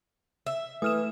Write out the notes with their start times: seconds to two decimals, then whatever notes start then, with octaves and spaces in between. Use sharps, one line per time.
0.46 E5
0.82 E3 A3 D#6 F6 E7